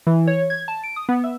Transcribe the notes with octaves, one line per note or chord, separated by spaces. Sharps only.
E3
C#5
G#6
A5
D7
D#6
B3
E5